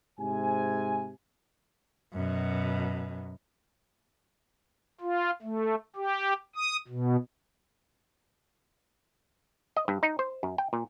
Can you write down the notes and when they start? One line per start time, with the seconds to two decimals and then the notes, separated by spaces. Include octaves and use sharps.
0.19 G#2 C3 G#5
2.13 F#2 B2
5.01 F4
5.42 A3
5.96 G4
6.55 D#6
6.88 B2
9.77 D#5
9.88 G2
10.03 D#4
10.19 C5
10.43 F#2
10.58 G5
10.73 A#2